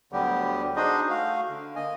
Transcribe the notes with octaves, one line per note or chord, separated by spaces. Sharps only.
D2 D3 F#3 G3 B3 G4
D4 D#4 F#4 G#4 C5 D#5
A3 F#4 F5
D3
A#3 D#5 G#5